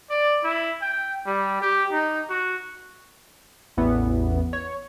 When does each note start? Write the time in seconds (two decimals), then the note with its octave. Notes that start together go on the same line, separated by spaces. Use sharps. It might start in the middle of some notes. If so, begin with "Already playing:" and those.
0.10 D5
0.44 E4
0.82 G5
1.27 G3
1.62 G4
1.92 D#4
2.30 F#4
3.77 A1 E2 E3 B3
4.53 C#5